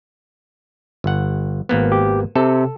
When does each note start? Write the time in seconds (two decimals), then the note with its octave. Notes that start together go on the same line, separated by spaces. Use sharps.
1.04 G1 F#5
1.69 G#1 A#3 B3
1.92 G4
2.36 C3 A4